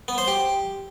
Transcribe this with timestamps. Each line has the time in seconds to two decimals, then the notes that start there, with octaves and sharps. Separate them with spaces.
0.08 B3
0.18 C5
0.28 G4